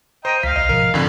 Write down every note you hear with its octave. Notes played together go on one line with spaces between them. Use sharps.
C5 D#5 G5 A#5
C#2 F5 B6
B1 D#5
G#2 B2 F3 A#4
F2 G#2 D3